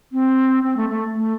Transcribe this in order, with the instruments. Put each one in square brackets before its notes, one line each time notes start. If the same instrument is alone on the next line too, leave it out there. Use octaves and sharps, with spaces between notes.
[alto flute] C4
C4
A3
A3
A3